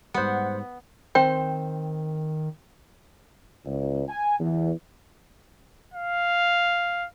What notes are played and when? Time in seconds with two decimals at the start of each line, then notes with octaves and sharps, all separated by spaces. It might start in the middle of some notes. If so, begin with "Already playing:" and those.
0.14 G#2 G3 B3 C5 F#5
1.15 D#3 C4 C5 G5
3.66 C#2
4.09 G#5
4.40 E2
5.94 F5